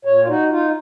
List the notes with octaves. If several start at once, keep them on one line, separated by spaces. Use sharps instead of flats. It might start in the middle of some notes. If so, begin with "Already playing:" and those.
A#2 C#5
F4
D#4 F#4
D#4 F4